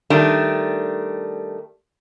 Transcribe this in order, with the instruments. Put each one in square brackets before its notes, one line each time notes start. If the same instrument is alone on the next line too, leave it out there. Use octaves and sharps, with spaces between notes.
[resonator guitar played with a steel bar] D#3 G3 A3 D4